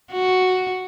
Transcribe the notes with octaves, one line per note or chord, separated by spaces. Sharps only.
F#4